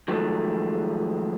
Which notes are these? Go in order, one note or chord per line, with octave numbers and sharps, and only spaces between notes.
D#3 F3 F#3 G#3 A3